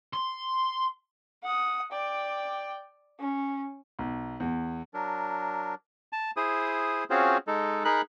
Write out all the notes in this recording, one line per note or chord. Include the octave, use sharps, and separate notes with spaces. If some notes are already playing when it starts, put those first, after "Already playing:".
C6
F#5 D#6
D5 G5
C#4
B1
E2
F#3 D4 A#4
A5
E4 G#4 C5 D#6
C4 C#4 F4 F#4 G#4 C5
G#3 D#4 A4
D#4 G#4 A#4 B5 F#6